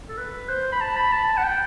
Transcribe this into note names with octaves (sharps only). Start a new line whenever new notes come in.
A4
B4
C5
B5
A5
B5
A5
F#5
G5